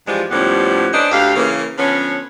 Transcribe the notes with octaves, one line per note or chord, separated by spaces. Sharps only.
G2 E3 F3 G3 G#3 F4
D#2 A2 F3 G3 B3 C#4
C#4 D4 B4 C5 D5 D#5
D2 G4 F5
C#3 E3 A#3
D3 F3 B3 C#4